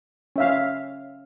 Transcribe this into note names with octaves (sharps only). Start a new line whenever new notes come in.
C#4 E5 F5